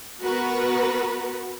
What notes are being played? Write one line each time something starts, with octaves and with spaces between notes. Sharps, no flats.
B3 F#4 A#4 B4